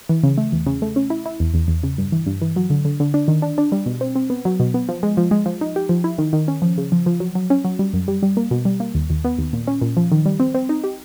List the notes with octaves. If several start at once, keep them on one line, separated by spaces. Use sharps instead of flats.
E3
C#3
A3
E2
C#3
A3
C#4
E4
E4
E2
E2
E2
C#3
G2
E3
G2
E3
F#3
D3
D3
D3
D4
D#3
D4
D4
G3
B2
C4
C4
B3
F#3
B2
B3
F3
G#3
F3
G#3
F3
D#4
G4
F3
E4
D#3
D#3
C#4
F3
C#3
F3
F3
F#3
F#3
C#4
F#3
G3
F#2
G3
G3
A#3
B2
G3
A#3
D#2
D#2
B3
D#2
A#2
C#4
A#2
F3
D#3
G3
C4
C4
D#4
G4